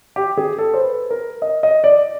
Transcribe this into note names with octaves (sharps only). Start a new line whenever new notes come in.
G4
G#4
A4
C5
B4
A#4
D#5
D#5
D5